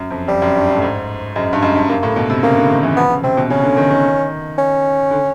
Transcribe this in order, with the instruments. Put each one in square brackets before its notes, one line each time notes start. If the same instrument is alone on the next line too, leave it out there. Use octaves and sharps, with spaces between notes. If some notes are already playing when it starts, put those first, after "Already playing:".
Already playing: [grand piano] F#2
F2
[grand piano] F2 [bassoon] G3
[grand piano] F#2
G2
G2
A2
G#2
[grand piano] F#2 [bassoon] G#3
[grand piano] G2
[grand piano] F#2 [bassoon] G#3
[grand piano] G2
[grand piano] G2 [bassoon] A#3
[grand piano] A2
B2
C3
[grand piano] C#3 [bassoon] A#3
[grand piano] D3
D#3
E3
[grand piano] F3 [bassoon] B3
[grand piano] C#3
[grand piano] C3 [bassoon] C4
[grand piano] B2
[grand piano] C#3 [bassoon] C#4
[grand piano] D3
D#3
D#3
[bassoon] C#4
[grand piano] D3